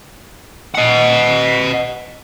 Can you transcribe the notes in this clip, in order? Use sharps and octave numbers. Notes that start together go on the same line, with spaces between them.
D#5 F#5